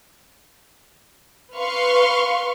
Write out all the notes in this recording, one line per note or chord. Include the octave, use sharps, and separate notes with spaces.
B4 F5 C6 C#6